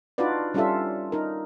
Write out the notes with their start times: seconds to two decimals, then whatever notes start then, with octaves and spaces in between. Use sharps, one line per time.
0.18 D4 D#4 F4 F#4 B4 D5
0.54 G3 C#4 D4 F4 A4 E5
1.12 D#4 A#4